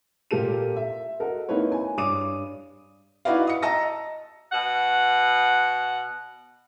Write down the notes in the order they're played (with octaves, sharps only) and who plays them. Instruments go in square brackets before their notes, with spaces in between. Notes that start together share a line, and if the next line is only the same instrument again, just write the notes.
[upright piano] A#2 A#3 G4 A4 D#7
E5
F#4 A4 A#4 D#5
A#3 C4 D#4 E4 B4 C#5
G#5
G2 C#5 D6 D#6 D#7
[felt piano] D#4 E4 F#4 B4 D5 F5
D#6 C#7
D#5 A5 A#5 E6 A#6
[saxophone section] B2 F#5